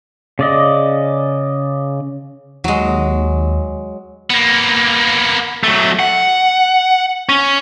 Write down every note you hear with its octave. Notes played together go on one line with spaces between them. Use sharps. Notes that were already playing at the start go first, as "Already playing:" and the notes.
C#3 D5 D#5
D#2 F#3 G#3
A#3 B3
F#3 A3
F#5
C#4